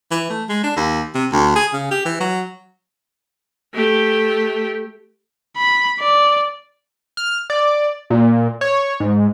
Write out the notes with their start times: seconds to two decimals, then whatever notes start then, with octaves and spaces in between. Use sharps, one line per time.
0.11 E3
0.30 A3
0.49 G#3
0.64 D4
0.76 D#2
1.15 C3
1.32 D2
1.56 G#4
1.73 C#3
1.91 G4
2.05 E3
2.20 F#3
3.74 A3 G4
5.57 B5
6.00 D5
7.17 F6
7.50 D5
8.10 A#2
8.61 C#5
9.00 G#2